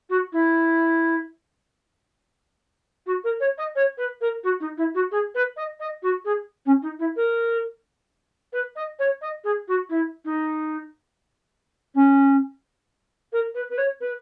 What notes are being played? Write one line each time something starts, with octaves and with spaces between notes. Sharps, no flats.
F#4
E4
F#4
A#4
C#5
D#5
C#5
B4
A#4
F#4
D#4
E4
F#4
G#4
B4
D#5
D#5
F#4
G#4
C#4
D#4
E4
A#4
B4
D#5
C#5
D#5
G#4
F#4
E4
D#4
C#4
A#4
B4
B4
C#5
B4